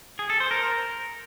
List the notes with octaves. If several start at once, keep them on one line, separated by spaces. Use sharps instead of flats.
G#4
A4
C5
A#4